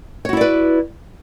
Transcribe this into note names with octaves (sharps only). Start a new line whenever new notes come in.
E4 F#4 B4 C#5 D5